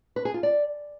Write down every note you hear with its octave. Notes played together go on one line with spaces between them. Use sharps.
B4
G#4
F4
D5